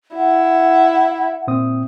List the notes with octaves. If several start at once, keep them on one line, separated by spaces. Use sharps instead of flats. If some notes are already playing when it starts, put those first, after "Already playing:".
E4 F#5
A#2 C4 D#6